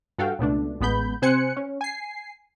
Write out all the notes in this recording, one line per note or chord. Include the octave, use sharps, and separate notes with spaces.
G2 F#4 A4 F5 G5
C#2 B2 A3 D4
A1 G#3 B3 B5 G6
C3 C4 C5 G#5 F#6 C#7
C#4
G#5 C7